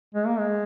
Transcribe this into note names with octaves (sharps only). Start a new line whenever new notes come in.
G#3
A#3
G#3